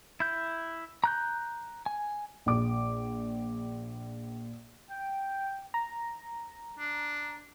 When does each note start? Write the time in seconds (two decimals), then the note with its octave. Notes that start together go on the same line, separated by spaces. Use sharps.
0.20 E4 G6
1.04 A#5 F#6 G6
1.86 G#5
2.46 A#1 D6
4.90 G5
5.74 A#5
6.79 D4